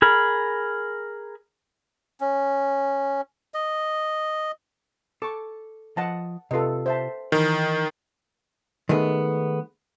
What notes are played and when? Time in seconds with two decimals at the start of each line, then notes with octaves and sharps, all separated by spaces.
0.02 G#4 A#4 B5
2.21 C#4
3.54 D#5
5.22 A4 C#6 D6
5.97 F3 D#5 F#5 A5
6.51 C3 F4 A4 B4 D#5
6.86 C5 E5 A5
7.32 D#3 E3 A#4
8.89 D#3 G#3 A3 B3